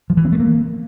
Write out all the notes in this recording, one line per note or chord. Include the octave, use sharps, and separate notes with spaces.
F3
E3
C4
A3
A#3